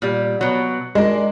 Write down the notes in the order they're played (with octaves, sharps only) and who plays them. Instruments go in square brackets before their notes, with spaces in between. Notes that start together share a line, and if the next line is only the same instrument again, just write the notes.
[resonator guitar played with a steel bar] A#2 G3
B2 F#3
[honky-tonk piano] G#3 [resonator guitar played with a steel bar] D4 A#4